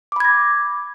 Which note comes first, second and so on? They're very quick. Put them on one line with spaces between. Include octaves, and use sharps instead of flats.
D6 B5 G#6 A#6